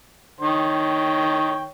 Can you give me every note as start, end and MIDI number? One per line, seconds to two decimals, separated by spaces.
0.41 1.70 51
0.41 1.70 73
0.41 1.70 79